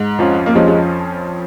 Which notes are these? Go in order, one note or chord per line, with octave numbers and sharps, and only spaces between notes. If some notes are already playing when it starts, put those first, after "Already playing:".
Already playing: G#2
F2 F3 C#4 F4
A#3
F2 F3 G#3 C#4 F4
G#3